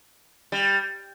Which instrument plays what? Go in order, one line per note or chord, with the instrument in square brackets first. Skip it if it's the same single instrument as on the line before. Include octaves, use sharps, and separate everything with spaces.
[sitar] G3